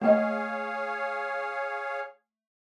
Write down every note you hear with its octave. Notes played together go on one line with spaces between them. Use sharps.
A3 A#3 G#4 C#5 D#5 F5